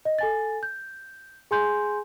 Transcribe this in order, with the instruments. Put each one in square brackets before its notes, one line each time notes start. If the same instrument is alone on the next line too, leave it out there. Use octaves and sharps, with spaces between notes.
[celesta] D#5
A4 G#5 A6
G6
G#4 G#5 C6 G6